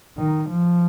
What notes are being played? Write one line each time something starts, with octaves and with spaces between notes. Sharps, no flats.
D#3
F3